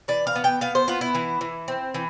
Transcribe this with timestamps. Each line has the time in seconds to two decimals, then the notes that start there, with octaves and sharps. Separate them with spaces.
0.08 E3 D5
0.27 F5
0.35 B3
0.44 G5
0.61 B3 F5
0.75 C5
0.88 B3 F4
1.01 E4
1.15 E3
1.41 E3
1.68 C4
1.94 E3